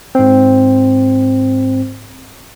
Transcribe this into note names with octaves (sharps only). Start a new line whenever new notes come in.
G#2 C4